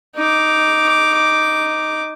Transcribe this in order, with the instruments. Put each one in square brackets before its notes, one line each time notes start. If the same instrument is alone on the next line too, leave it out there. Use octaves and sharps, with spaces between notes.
[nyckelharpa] D#4 D6